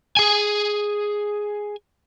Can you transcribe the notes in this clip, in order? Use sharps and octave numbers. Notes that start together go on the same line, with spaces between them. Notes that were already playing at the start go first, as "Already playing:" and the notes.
G#4 G#5